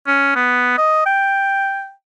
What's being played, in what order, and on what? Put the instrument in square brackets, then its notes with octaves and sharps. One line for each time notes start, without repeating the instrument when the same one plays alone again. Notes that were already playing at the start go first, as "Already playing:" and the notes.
[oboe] C#4
B3
D#5
G5